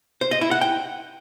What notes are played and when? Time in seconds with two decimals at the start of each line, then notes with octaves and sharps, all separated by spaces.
0.21 C5
0.31 D#5
0.41 E4
0.51 F#5
0.61 G5